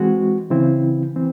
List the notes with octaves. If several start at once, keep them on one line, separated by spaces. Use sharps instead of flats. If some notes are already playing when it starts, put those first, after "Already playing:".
Already playing: E3 G#3 C4 F#4
C#3 E3 C4 E4
E3 C4